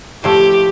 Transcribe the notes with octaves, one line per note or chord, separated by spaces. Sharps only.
A2 F3 A3 G4